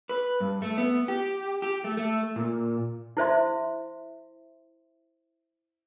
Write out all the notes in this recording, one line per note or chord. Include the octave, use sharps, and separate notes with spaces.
B4
G2
A3
B3
G4
G4
A3
A3
A#2
E4 C5 E5 C6